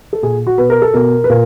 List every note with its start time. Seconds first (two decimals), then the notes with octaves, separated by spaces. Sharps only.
0.13 A4
0.22 A#2 G#4
0.47 F#4
0.58 B2 B4
0.70 A#4
0.82 A4
0.94 B2 A#4
1.24 B4
1.30 A#2 A#4